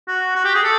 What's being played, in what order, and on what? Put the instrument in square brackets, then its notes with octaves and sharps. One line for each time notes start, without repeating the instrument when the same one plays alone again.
[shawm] F#4
F#4
G4
G#4
A4